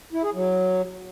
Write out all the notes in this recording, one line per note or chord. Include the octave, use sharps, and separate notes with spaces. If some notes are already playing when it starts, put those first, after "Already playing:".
E4
G#4
F#3